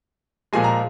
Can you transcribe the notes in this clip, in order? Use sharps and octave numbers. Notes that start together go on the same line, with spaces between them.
A#2 F3 G#3 G#5
A#5